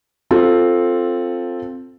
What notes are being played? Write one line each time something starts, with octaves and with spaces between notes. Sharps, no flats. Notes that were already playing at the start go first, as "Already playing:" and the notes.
C4 F4 A4